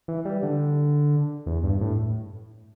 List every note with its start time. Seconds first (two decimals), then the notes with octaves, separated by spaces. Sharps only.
0.08 E3
0.25 G3
0.43 D3
1.46 E2
1.64 G2
1.81 A2